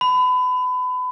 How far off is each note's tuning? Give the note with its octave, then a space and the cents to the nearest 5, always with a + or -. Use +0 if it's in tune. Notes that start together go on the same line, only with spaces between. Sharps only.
B5 +30